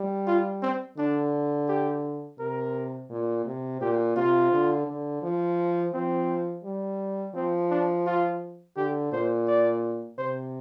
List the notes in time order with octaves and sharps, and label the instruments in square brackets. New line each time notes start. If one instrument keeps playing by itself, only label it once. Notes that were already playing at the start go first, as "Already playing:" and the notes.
Already playing: [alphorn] G3
[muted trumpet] F4
C4
[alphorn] D3 [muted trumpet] D4
[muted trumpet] G4
[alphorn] C3 [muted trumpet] A#4
[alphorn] A#2
C3
[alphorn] A#2 [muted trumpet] G4
[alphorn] C3 [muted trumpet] F4
[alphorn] D3
D3
F3
[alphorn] F3 [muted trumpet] C4
[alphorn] G3
[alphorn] F3 [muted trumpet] C4
[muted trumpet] D4
F4
[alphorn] D3 [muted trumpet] G4
[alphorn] A#2 [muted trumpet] C5
[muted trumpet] D5
[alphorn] C3 [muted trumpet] C5